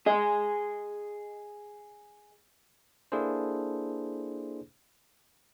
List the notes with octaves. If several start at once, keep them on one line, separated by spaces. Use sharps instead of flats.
G#4 D#5
A#3 D4 E4 G#4 A4 C5